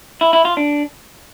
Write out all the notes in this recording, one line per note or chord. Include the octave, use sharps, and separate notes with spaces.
E4
E4
F4
D4